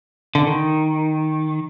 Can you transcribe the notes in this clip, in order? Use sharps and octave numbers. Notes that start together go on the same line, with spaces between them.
D3
D#3